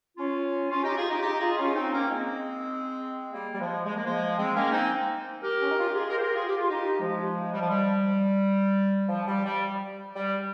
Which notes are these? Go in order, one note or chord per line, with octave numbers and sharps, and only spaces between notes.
C#4 F4
C#4 F4
D#4 G4
F4 G#4
D#4 G4
D#4 G4
F4 G#4
C#4 F4
C4 D#4
A#3 C#4
G#3 C4
G3 A#3
G3
F3 G#3
G#3
A#3
F3 G#3
G#3 C4
A#3 C#4
C4 D#4
G4 A#4
C#4
D#4
F4
G4
F4 G#4
G4 A#4
C5
G4 A#4
F4 G#4
G4
F4
D#4 G4
F3 G#3
G3
F3
G3
F3
G3
G3
G3